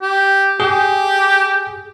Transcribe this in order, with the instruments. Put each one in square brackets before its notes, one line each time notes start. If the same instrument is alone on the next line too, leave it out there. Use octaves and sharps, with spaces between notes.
[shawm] G4
[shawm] G4 [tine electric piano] G#4